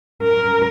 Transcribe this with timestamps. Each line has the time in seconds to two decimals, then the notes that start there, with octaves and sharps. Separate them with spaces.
0.23 A#4